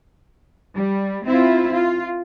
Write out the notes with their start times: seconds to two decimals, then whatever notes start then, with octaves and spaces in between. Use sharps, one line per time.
0.76 G3
1.26 C4 E4 F4
1.73 F4